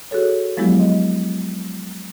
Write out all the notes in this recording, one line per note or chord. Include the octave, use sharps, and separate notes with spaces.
F#4 G#4 A4 C#5
F3 F#3 G#3 B3 E4 G4
D#5